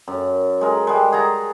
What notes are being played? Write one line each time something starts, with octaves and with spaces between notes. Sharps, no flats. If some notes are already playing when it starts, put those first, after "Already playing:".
F#2
G#3 A#4
G3 G#3
G#4 F#5 A5 A#5